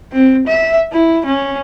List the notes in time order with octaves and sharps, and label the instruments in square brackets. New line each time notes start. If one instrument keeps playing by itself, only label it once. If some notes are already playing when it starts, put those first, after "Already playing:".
[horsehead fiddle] C4
E5
E4
C#4